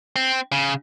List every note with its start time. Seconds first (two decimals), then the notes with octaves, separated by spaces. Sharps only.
0.16 C4
0.52 C#3